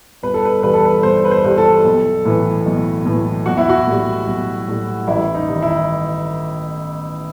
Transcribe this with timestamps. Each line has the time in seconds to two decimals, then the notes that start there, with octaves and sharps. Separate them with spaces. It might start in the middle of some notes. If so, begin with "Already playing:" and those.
0.23 G1 B4
0.34 A4
0.45 B4
0.63 G2 E3 G3 B4
0.74 A4
0.85 B4
1.03 G1 C5
1.25 B4
1.31 C5
1.44 G2 E3 G3
1.58 A4
1.84 B1
2.25 A2 E3
2.66 B1
3.06 A2 E3
3.46 B1 F#4
3.57 E4
3.69 F#4
3.87 A2 G3
4.27 B1
4.68 A2 G3
5.08 A1 E4
5.35 D#4
5.48 G2 D#3
5.62 E4